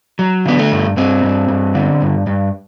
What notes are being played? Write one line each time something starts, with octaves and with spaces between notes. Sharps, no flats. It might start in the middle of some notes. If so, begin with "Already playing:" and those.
F#3
D3 B3
A3
G2
G2 C4
G2
G2
D3
G2
G2